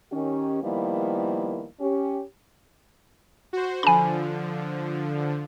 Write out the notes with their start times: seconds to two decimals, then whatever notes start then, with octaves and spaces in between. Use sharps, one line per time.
0.12 D#3 C#4 G4
0.63 D#3 F3 G3 A#3 B3 E4
1.80 C#4 G4
3.53 F#4 C5
3.83 D3 F3 G#5 B5